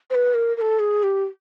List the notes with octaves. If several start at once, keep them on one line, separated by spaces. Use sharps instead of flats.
C5
B4
A#4
A#4
A4
G#4
G4